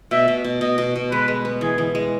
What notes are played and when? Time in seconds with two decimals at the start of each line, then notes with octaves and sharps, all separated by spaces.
0.11 B2 E5
0.28 B2
0.44 B2
0.61 B2 D#5
0.78 B2
0.96 B2
1.11 G#3 B4
1.28 G#3
1.45 B3
1.61 E3 G#4
1.78 E3
1.95 G#3